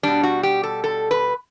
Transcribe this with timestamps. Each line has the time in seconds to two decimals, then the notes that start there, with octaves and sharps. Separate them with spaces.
0.03 B2 G3 D4
0.23 F#4
0.43 G4
0.63 A4
0.84 A4
1.11 B4